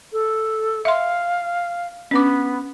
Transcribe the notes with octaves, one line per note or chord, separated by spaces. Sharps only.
A4
E5 F5 C6
B3 C#4 D4 D6